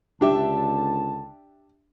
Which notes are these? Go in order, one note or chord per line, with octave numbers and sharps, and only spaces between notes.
C#2 D3 D4 G4 E5 A5